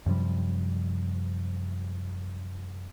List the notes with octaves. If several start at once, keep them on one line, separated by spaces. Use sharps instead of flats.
F#2 C3 F3 G3